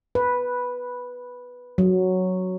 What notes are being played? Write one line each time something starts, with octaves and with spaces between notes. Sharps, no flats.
B4
F#3